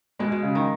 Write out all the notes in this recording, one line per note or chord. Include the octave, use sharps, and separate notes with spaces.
B2 G#3
B2
C#3
D#3